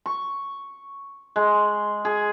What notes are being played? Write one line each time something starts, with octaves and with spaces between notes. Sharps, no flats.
C#6
G#3
G#4